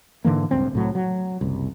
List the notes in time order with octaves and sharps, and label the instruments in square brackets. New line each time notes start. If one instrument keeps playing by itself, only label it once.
[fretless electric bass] G#2 D3 E3 A#3
D1 C#2 G2 C4
C2 A2 F#3
F#3
F#1 C2